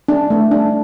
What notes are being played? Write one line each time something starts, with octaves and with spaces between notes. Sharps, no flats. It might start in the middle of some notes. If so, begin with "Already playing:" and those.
D4
A3
D4